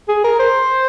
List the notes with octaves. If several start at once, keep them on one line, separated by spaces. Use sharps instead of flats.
G#4
A#4
C5